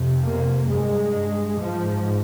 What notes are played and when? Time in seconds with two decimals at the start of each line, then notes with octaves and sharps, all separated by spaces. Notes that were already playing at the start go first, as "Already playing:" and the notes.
Already playing: F2 C3
0.26 A#3
0.70 G2 G#3
1.60 G#2 F3